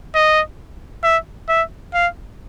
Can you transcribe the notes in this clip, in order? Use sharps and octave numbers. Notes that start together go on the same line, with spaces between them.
D#5
E5
E5
F5